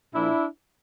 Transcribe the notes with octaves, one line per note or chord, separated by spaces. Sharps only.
A#2 F3 D4 E4